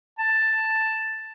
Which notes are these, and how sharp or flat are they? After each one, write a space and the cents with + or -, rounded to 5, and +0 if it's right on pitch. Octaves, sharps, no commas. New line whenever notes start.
A5 +5